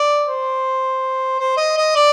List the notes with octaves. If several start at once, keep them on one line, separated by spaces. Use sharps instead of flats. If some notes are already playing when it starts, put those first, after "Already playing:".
Already playing: D5
C5
C5
D#5
D#5
D5